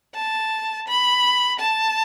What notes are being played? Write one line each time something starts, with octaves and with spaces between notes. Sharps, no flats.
A5
B5
A5